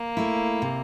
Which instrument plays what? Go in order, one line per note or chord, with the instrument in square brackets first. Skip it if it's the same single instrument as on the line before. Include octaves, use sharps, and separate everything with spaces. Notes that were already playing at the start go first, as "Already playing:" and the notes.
Already playing: [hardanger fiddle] A#3
[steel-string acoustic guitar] A3 E4
C3